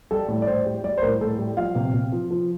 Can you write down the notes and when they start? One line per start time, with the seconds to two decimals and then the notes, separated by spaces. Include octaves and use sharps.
0.11 G3 A4
0.28 A2
0.42 D5
0.47 A2 C5
0.66 G3
0.84 G3 D5
0.98 C5
1.02 A2 A#4
1.21 A2 A4
1.38 G3
1.57 F3 F5
1.75 C3
1.94 C3
2.12 F3
2.31 F3